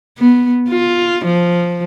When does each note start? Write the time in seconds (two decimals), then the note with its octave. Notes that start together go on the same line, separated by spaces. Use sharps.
0.18 B3
0.69 F4
1.25 F3